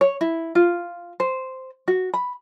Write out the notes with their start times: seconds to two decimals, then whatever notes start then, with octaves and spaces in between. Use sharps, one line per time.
0.01 C#5
0.21 E4
0.55 F4
1.20 C5
1.88 F#4
2.14 B5